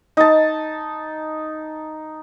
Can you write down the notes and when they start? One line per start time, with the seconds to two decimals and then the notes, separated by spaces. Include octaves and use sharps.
0.17 D#4 A5